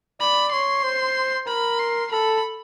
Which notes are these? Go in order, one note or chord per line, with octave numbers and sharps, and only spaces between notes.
D5 B5
C#5 C6
C5
A#4 B5
C6
A4 B5